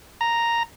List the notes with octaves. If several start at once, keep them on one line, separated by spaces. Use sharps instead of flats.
A#5